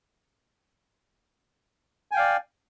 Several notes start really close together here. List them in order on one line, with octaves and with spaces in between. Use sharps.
G#5 G5 F5 D5